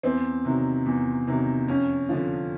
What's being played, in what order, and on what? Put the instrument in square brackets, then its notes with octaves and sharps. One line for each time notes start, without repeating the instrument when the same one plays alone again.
[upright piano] E2 C4
C3 D#3 F#3
E2
C3 D#3 F#3
F2 C#4
D3 F3